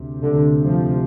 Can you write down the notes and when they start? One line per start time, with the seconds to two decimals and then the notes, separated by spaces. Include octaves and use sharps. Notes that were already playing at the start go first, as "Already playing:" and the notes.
Already playing: D2 C3
0.22 D3
0.65 F3